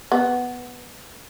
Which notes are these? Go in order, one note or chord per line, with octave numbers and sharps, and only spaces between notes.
B3